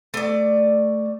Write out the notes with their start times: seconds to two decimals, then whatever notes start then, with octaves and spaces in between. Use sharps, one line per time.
0.14 A3 D5